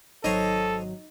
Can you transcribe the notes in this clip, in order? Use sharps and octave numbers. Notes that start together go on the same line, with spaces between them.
G#1 F#3 D#4 A4 C5 C#5 D#5